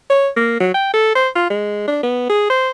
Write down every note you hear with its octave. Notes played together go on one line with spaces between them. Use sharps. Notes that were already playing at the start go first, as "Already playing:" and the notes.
C#5
A#3
F#3
G5
A4
C5
F4
G#3
D4
B3
G#4
C5